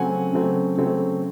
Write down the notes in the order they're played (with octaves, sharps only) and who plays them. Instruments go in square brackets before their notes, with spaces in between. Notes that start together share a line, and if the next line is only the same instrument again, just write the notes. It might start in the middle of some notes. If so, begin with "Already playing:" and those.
Already playing: [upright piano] C#3 F#3 A3 C4 F#5 G#5
C#3 F#3 A3 C4
C#3 F#3 A3 C4